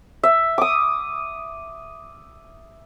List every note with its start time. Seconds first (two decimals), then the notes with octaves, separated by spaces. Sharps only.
0.23 E5
0.58 D6 D#6